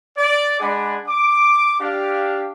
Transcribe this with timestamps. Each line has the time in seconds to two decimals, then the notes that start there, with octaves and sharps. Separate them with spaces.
0.17 D5
0.60 G#3 D4 G#4 D5 F#5 B5
1.07 D6
1.79 D4 G4 F5